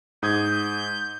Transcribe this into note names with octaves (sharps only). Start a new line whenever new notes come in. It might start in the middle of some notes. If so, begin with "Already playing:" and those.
G#2 D#6 G6 G#6